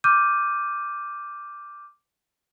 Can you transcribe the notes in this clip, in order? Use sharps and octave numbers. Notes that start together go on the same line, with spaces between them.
D6 F6 G6 D#7